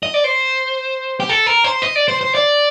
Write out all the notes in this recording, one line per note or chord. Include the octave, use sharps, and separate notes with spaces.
D#5
D5
C5
G4
A4
A#4
C5
D#5
D5
C5
C5
D5